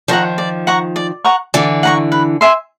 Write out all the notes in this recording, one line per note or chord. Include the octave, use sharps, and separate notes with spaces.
D#3 F3 F#5 A#5 C#6
D5
F#5 A#5 C#6
D5
F#5 A#5 C#6
D3 E3 D5
F#5 A#5 C#6
B4
E5 G#5 C6